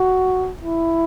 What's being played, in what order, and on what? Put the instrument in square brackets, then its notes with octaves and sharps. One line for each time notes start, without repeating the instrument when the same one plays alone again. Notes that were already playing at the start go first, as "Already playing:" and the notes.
Already playing: [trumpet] F#4
E4